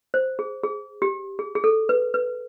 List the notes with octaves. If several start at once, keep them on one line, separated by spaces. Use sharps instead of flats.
C5
G#4
G#4
G4
G#4
G#4
A4
B4
B4